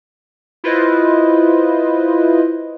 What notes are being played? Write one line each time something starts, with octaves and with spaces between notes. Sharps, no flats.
E4 F4 B4 C5 D#5